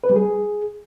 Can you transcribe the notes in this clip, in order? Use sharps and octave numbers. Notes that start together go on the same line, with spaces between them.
B4
G3
G#4